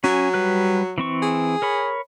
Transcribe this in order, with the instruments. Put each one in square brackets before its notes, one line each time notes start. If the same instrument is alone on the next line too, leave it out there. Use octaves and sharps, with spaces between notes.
[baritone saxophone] F#3 [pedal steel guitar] C#4 G#5
[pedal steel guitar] G3 B4 F#6
E3 C4 C#6
[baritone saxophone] G#4
[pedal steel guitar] A#4 C#5 B5